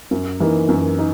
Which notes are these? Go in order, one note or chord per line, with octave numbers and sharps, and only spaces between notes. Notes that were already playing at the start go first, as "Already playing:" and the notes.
F#2
E3 A#3 D#4
F#2
D#4